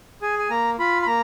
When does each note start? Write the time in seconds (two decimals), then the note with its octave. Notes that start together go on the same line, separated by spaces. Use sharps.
0.22 G#4 G#5
0.39 G#5
0.50 A#3 A#5
0.79 F4 B5
1.02 B5
1.06 A#3 A#5